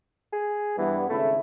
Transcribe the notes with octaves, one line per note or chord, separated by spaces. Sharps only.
G#4
G2 E3 G3 B3
G#1 C#3 A3 E4